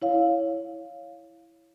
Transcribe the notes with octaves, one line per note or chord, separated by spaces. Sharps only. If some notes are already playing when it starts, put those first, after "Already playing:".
E4 C#5 F5